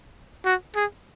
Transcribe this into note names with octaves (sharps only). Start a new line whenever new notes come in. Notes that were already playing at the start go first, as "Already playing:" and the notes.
F#4
G#4